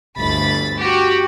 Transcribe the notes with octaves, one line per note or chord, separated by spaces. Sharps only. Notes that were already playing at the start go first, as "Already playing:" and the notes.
G1 D2 B5 A6
F#4 G4